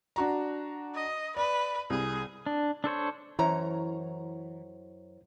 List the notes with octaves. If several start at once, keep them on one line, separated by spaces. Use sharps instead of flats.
D4 F#4 A#5
D#5
B4 D5
C2 G#4
D4
D4 A4 C5 C#5
F#2 E3 E4 C5 C#5 A#5